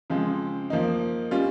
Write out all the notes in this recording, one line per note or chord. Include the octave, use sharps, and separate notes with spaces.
C#3 F3 G#3 C4
F3 A#3 D#4
G3 C#4 F4